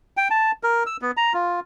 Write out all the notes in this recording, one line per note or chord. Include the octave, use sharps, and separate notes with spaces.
G5
A5
A#4
E6
B3
A#5
F4